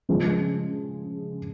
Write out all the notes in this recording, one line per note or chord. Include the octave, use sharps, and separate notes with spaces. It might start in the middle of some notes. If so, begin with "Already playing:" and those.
C#3 F3 G#3